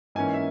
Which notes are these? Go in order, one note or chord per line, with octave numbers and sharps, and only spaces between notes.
G#2 E3 A#3 C#4 G#5
E5